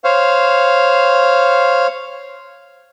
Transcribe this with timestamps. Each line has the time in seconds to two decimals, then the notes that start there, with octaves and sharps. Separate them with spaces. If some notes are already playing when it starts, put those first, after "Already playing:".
0.04 C5 C#5 F5